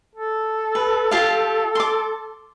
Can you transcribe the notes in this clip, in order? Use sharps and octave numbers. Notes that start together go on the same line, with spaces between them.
A4
B4
F4 G4 F5
C6 D6